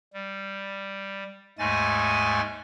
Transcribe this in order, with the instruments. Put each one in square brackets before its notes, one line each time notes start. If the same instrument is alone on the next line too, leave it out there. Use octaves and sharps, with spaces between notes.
[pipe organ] G3
D#2 G#2 G#3 A3 G#5 A6